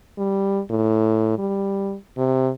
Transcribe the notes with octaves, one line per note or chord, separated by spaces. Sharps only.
G3
A2
G3
C3